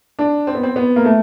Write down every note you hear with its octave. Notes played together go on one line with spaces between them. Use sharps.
D4
C4
B3
C4
B3
A#3
A3